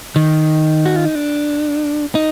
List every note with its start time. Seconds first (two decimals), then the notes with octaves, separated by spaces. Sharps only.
0.16 D#3
0.86 F#4
0.96 F4
1.05 D#4
1.15 D4
2.15 D#4